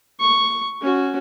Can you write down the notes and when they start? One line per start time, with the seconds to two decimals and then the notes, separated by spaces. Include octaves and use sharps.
0.20 C#6
0.81 C#4 F#4